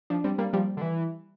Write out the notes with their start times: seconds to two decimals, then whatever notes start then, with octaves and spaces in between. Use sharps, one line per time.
0.10 F3 D4
0.24 G3 C4
0.38 G3 A#3
0.53 F3 G3
0.77 D3
0.81 E3